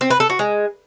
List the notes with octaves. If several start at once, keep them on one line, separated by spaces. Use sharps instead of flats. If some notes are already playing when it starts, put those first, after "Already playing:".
C4
B4
A4
F#4
G#3